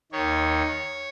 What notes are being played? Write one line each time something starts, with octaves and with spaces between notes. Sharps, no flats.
D#2 D#3 C#5